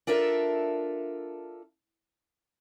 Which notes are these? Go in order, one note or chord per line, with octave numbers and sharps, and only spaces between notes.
D4 F4 A4 A#4 E5